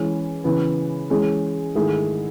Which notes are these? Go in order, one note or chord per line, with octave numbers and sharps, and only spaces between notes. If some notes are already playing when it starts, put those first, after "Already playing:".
Already playing: E3 G#3 C#4
C#3 E3 B3
E3 G#3 C#4 G#4
G#2 D#3 A3 E4 G#4